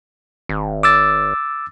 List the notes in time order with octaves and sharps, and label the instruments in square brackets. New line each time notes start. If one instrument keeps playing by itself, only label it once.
[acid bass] G#1
[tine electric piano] D6 E6 A6